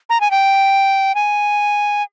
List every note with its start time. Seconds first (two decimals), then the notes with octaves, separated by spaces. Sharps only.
0.10 A#5
0.21 G#5
0.31 G5
1.15 G#5